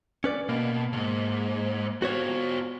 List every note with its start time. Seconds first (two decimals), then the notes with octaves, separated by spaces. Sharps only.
0.24 C#4 B4 D5
0.49 B2 A#3
0.93 C#2 G#2
2.02 B3 F4 F#4 C5 C#5